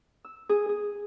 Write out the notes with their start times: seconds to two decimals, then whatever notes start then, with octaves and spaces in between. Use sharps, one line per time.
0.25 E6
0.49 G#4
0.69 G#4